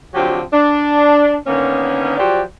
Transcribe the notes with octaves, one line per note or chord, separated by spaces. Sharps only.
D3 F3 F#3 C4 G4
D4
D3 D#3 A#3 B3 C#4
F3 F#3 F#4 G4 C5 D5